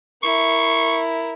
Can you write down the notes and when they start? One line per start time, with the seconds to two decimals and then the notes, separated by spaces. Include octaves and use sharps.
0.23 E4 A#4 C#6